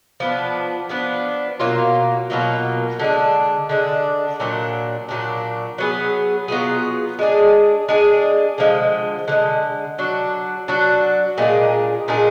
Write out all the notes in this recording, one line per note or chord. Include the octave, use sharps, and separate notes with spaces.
F3 B3 D4
F3 B3 D4
B2 F#3 A#3 F4
B2 F#3 A#3 F4
D3 G#3 D4
D3 G#3 D4
A#2 F#3 D4
A#2 F#3 D4
F#3 B3 F4 G#4
F#3 B3 F4 G#4
G#3 D4 G#4
G#3 D4 G#4
D3 F3 G#3
D3 F3 G#3
F#3 D4 F#4
F#3 D4 F#4
A#2 G#3 D4 G#4
A#2 G#3 D4 G#4